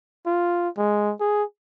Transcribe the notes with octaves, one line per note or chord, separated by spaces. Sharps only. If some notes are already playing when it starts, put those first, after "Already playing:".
F4
G#3
G#4